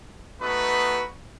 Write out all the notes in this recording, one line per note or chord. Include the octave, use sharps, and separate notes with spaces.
A3 B3 D#4 F#4 B4